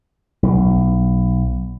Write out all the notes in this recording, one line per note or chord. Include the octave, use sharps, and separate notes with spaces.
B1